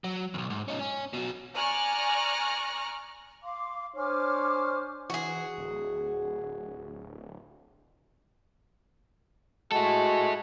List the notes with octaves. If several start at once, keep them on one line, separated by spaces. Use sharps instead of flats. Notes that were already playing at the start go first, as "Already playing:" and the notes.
F#3
B1 E2
G#2
C#4 D#4
C#4
B2 F#3
D5 G#5 A#5 C#6 F6 F#6
F5 C6 D6
D4 C5 C#5 G#5 D6 F6
E3 F#4 G#4
D1
G#3 E4 F#4 A4